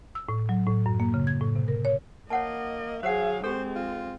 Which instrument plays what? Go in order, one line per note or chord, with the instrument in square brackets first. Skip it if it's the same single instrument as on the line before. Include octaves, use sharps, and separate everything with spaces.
[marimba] E6
A2
F#3
A2
F#2
A#3
C#3
G#6
A2
C3
A#4
C#5
[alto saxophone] A#3 [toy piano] C#5 F#5 A5 [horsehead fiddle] D#5
[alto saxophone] F#3 [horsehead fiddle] G#4 F5 [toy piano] C5 F#5
[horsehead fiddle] G#3 C4 [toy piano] G4 A4 [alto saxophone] C5
[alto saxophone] F4